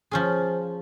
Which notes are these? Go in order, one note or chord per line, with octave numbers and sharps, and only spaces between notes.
F3 C#4 G#4